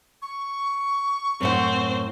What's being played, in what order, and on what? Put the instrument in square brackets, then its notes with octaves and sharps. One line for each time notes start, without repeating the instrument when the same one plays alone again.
[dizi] C#6
[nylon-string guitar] F#2 A2 F#5 [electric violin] C4 C5